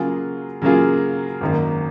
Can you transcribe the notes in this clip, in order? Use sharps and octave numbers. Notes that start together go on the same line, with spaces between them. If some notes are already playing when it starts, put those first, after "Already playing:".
Already playing: C#3 F#3 A#3 F4 G#4
C#3 F#3 A#3 F4 G#4
G#1 F#2 D#3 A#3